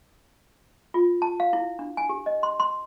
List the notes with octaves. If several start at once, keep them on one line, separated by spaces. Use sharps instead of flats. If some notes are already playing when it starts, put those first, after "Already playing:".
F4
A5
F5
E4
D4
G#5
G4
D#5
C6
C6